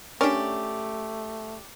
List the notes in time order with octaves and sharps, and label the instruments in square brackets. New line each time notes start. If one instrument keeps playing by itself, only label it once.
[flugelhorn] A3 [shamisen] C#4 [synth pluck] D4 A#4 [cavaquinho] G4 D5